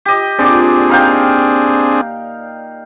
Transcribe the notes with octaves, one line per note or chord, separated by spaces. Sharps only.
G4 D#5
A#2 C4 D4 G#4 D5
D#4 F5 G5